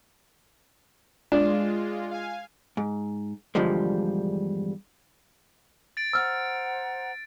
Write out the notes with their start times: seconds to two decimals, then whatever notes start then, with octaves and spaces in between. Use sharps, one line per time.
1.32 G#3 D4 F4
2.11 F5 G#5
2.77 G#2
3.55 E2 G2 D3 F3 G3 G#3
5.97 A6 D7
6.13 C5 F#5 A#5 E6 F6